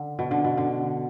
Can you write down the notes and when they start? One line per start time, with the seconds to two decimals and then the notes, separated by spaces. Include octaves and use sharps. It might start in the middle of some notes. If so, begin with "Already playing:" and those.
Already playing: D3
0.19 B2
0.31 D3
0.45 B2
0.57 D3